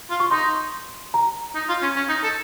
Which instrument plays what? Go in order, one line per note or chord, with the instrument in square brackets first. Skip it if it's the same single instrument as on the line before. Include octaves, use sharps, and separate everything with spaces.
[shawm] F4
[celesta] C#6
[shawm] D#4 [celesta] C6
[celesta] A#5
[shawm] D#4
F4
C#4
C#4
D#4
A4